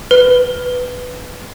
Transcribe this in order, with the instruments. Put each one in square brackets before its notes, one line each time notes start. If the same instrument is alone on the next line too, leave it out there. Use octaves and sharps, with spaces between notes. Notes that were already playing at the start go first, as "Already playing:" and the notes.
[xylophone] B4